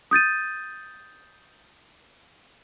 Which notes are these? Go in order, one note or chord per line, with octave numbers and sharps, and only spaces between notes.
D#6 G6 A6 D#7